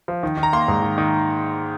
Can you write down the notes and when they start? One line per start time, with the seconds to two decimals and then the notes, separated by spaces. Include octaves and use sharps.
0.08 F3
0.23 D#3
0.37 D#3
0.43 A#5
0.53 A#3 C6
0.68 G#2
0.82 D#3
0.98 D#3